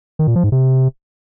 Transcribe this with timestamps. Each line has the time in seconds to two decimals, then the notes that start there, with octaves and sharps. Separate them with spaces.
0.19 D#3
0.27 A#2
0.36 F3
0.44 G#2
0.52 C3